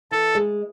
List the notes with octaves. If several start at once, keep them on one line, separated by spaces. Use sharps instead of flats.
E3 A4
G#3